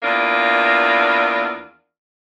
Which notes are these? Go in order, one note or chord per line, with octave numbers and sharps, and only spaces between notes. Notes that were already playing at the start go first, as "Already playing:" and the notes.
E2 A#3 D4 F4